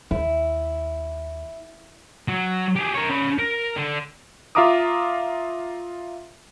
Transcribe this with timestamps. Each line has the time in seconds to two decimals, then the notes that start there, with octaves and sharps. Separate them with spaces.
0.11 D#2 E4
2.28 F#3
2.76 G4 G#4
2.95 A#4 C#5
3.10 C#4 B5
3.39 A#4
3.76 D3
4.55 F4 E5 F5 A#5 D6 D#6